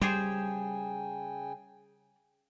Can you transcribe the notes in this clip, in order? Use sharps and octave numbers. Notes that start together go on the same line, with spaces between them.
C#3 G3 G4 G#4 C5 G5 G#5